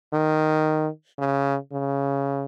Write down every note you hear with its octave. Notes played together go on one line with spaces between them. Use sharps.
D#3
C#3
C#3